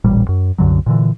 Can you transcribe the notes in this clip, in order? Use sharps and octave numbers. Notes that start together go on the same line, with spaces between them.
D#1 A1 A#2 G3
F#2
C2 F#2 D3 F#3
A#2 D3 E3